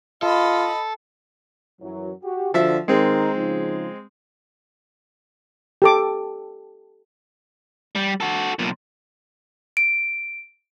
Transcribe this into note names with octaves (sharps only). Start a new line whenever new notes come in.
F4 A4 D#5 B5
F#2 E3 F#3
F#4 G4
D3 F3 D4 F#4 E5
D#3 G#3 C4 D#4 A#4
C#3 F3 D#4
G4 A4 D6
G3
F#4 A4
B1 A#2
D7